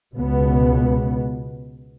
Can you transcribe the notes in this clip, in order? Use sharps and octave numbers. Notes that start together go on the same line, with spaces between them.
C#2 B2 B3